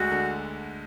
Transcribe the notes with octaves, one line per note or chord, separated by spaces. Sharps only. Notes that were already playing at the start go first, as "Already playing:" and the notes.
Already playing: D2 G#3 F#4
D3